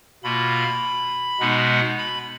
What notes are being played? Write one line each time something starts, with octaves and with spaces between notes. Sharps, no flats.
B2 A#3 F4 B5
B2 G#3 B3 D#4
B5